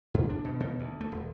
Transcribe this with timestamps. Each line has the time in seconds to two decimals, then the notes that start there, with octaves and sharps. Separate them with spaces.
0.14 G2
0.29 D4
0.45 B2
0.60 B2
0.79 D2
1.01 A3
1.12 D#1